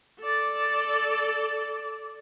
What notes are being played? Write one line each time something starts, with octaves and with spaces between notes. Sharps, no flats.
A4 D5